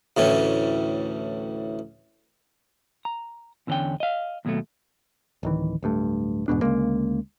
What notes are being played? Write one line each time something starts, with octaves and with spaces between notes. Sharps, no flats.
D2 A2 E3 C#4
A#5
E2 D3 D#3 C#4 D4 G5
D#5 F5
D#2 B2 F#3 G3 A3
D1 D#3 E3
D1 G2 A3
E2 G#2 B2 D4
D2 C#3 G#3 A#3